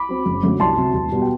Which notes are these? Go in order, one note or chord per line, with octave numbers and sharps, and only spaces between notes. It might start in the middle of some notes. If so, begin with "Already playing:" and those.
Already playing: B5 D6
F#3 C4
F#1
F#2 D3 F#3 A3
C2 A5 C6
C3 F#3
E1
B2 G3 B3
G5